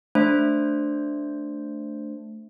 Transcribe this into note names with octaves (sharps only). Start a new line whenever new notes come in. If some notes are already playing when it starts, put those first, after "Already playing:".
A3 D4 C5